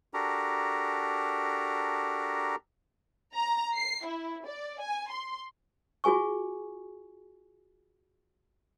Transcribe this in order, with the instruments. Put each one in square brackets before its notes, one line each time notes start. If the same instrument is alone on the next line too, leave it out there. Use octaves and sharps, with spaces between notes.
[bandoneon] D4 F#4 G4 A4 A#4 A#5
[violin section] A#5
C7
E4
D5
G#5
C6
[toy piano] F4 F#4 G#4 G#5 C#6